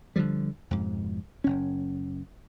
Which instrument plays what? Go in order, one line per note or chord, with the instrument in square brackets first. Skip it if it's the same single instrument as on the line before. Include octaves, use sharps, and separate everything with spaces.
[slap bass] D3 E3 F3 G3
F2 G#2 B2
F#1 C#4